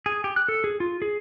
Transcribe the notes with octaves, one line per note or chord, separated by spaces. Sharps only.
G#4
G4
F#6
A4
G#4
F4
G#4